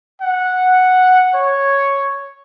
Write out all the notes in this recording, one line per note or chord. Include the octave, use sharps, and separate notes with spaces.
F#5
C#5